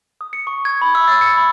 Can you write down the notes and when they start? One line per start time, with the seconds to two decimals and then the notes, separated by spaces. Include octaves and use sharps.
0.21 D#6
0.33 C#7
0.47 C#6
0.65 G#6
0.82 B5
0.95 E6
1.08 A6
1.21 C#7
1.37 B5